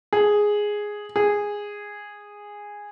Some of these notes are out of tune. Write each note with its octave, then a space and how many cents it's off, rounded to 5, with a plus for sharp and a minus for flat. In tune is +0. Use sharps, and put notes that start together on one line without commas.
G#4 +0
G#4 -10